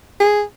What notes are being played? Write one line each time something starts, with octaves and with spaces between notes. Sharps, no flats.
G#4